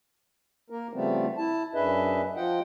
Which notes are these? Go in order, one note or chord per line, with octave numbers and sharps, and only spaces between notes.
A#3 A#4
C#3 F3 G3 A3 B3 C4
E4 A5
F#2 D4 G#4 B4 D#5 E5
F3 F4 D#5 F#5 G5